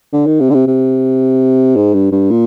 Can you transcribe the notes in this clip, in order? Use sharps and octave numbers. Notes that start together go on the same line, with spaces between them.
D3
D#3
C3
D3
C3
C3
G#2
G2
G2
A#2